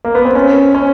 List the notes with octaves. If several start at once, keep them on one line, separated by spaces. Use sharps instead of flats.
A#3
B3
C4
C#4
C#4